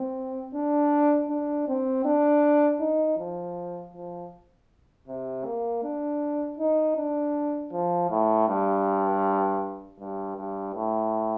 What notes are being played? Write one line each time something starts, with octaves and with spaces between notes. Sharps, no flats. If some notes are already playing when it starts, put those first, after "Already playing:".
Already playing: C4
D4
D4
C4
D4
D#4
F3
F3
C3
A#3
D4
D#4
D4
F3
A2
G2
G2
G2
A2